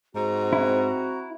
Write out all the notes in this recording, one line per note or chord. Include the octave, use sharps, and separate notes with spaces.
G#2 C4 F#4 A#5
E4